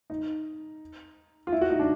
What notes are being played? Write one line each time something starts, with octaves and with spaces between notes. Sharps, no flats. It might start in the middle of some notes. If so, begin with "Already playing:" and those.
D#4
F4
E4
F#4
D#4
D4